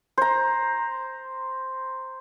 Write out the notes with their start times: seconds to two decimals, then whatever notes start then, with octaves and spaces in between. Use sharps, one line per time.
0.18 C5 A#5